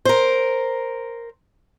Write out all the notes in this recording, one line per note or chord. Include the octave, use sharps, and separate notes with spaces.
A#4 C5